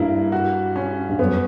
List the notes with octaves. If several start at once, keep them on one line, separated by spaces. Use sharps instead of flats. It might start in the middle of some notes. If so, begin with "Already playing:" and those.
Already playing: G2 A#3 E4
F#4
C#4
G2
F#2 B3